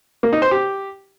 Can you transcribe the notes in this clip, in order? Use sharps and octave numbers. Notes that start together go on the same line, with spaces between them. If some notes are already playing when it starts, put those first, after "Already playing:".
A#3
D#4
C5
G4